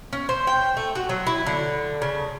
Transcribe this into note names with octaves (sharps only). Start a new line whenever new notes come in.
C#4
C5
G5
A3
F#4
F#3
E4
D3
C#3